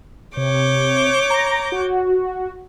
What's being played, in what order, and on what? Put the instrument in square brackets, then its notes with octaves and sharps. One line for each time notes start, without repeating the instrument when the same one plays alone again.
[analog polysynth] C3 [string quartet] C#5 D6 G6
[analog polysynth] A#5 A#6
F#4